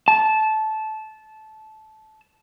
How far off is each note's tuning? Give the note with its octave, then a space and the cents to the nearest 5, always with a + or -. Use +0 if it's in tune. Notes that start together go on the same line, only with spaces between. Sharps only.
A5 -15